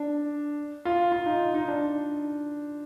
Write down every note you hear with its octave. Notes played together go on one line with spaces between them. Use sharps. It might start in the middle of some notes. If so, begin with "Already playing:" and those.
Already playing: D4
F4
F4
D#4
D#4
D4